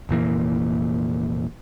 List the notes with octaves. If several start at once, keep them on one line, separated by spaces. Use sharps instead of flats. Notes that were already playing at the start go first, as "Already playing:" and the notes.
F1 A#2 E3 A#3